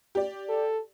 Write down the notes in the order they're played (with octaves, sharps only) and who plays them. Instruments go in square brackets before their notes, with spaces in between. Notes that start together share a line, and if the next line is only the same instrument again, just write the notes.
[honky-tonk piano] G4 D5
[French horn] A4